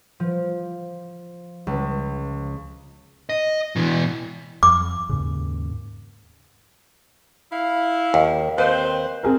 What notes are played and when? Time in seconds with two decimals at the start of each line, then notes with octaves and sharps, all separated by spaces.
0.20 F3
1.67 C#2
3.29 D#5
3.76 B2 E3
4.63 F2 D6
5.09 D#2 G#2 C#3
7.52 E4 F5
8.14 D#2
8.58 D#2 C4 B4 C5
9.23 C4 G#4 A#4